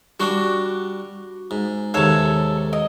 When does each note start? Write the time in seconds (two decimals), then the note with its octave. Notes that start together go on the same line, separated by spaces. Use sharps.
0.20 G3 D4 F#4 D6
1.51 G#2
1.94 D#2 G#2 C3 A4 C#5
2.73 D#5